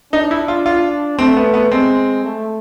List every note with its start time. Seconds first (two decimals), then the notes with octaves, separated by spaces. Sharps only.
0.13 D4 D#4
0.31 E4
0.48 F4
0.66 F4
1.19 A3 C4
1.37 B3
1.54 B3
1.72 G#3 C4
2.24 A3